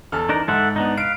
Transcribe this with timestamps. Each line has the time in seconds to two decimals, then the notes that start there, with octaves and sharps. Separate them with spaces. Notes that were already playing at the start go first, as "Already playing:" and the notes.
0.12 E2 A4 F6
0.29 E3 D4 D#4 A#4
0.48 G#2 A4 E5 F#5
0.76 B3 D4 D#4
0.97 B4 F5 D7